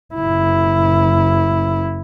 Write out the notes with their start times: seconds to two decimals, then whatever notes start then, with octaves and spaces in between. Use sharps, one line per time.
0.15 F#1 E4